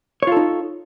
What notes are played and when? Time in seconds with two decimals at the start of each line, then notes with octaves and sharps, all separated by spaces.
0.23 C#5
0.27 F4
0.32 A4
0.37 D#4